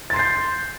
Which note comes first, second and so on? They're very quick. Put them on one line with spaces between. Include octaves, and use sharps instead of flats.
A6 C6 C7 G6